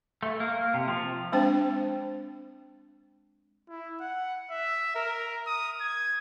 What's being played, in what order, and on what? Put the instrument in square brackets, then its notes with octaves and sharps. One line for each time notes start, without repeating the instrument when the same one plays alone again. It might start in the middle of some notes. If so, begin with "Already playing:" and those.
[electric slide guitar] A3
A#3
C3
F3
[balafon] G#3 C4 D4 C5 G5
[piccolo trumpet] E4
F#5
E5
A#4
D#6
G#6